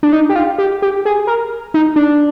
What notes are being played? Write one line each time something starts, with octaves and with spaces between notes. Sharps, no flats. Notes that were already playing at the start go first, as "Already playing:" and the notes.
D4
D#4
G4
F4
G4
G4
G#4
A#4
D#4
D4